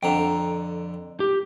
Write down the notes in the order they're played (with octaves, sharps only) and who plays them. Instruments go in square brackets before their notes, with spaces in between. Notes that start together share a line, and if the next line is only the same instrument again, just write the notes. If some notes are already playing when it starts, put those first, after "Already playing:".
[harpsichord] F2 D3 [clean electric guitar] G5 A#5
[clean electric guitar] G4